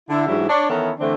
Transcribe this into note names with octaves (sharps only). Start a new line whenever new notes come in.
D3 E4
G#2 E3 F#3 G3 D4 E4
D4 C#5 D5
D#3 E3 B3 C#4 E4 A4
D3 E3 A3 C4 D4